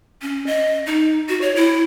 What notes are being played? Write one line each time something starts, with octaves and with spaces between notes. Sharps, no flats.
C#4
D#5
D#4
F#4
C#5
E4